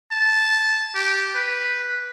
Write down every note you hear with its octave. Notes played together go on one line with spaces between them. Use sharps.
A5
G4
B4